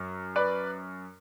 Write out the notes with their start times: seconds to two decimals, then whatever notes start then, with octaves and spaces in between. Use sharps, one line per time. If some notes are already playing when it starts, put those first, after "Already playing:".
Already playing: F#2
0.36 B4 D5